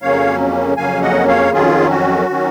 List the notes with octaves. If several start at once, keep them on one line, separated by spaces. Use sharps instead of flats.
F2 C#3 F#3 A#3 C#4 C#5 F5
F2 C#3 F#3 A#3 C#4 F5 G#5
D#5 F#5
C#5 F5
F2 D#3 F#3 C#4 F4 G#4
F#4
D#3 F#3 C#4